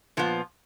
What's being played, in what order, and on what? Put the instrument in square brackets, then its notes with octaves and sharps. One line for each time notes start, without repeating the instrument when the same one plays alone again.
[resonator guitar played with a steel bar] A#2 F3 B3 F4